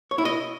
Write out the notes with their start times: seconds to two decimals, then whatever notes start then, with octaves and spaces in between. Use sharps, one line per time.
0.11 C#5
0.18 E4
0.25 D#5